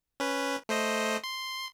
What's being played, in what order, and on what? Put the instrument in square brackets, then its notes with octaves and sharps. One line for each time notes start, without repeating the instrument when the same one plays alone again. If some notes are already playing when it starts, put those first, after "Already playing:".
[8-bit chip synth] C#4 B4
A3 C5 D#5
C6